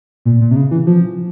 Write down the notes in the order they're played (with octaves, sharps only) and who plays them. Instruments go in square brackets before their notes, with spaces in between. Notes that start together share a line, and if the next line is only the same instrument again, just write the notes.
[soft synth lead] A#2
A#2
C3
C#3
E3
F3